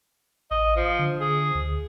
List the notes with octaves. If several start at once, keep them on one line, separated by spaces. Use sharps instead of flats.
A1 D#5
F3
D3
G#4
D2